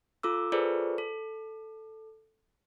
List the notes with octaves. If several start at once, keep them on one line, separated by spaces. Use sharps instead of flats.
F4 A4 D6 E6
F4 G#4 A4 B4 C5 D5
A4